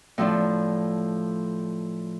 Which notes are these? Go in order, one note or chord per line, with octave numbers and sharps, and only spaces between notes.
A2 F3 D4